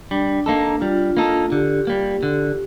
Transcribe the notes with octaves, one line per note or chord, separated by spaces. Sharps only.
G3 D4
A#3 D#4 A4
G3 F4
A#3 D#4 A4
D3 G4
G3 A#3
D3